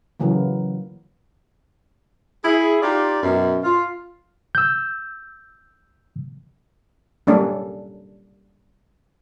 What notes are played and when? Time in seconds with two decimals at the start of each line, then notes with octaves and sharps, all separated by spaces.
0.20 C#3 E3 F#3 A#3
2.45 E4 G#4
2.82 D#4 F4 G4 D5
3.23 F#2 B2
3.64 F4
4.55 E6 G6
7.27 G3 A#3 C#4 D4 A4